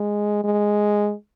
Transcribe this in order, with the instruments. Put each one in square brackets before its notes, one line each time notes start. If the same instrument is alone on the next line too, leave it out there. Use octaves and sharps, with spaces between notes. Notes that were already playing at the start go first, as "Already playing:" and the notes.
Already playing: [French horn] G#3
G#3